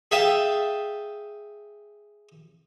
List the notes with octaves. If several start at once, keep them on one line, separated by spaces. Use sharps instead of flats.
G#4 E5 F5 G5 A5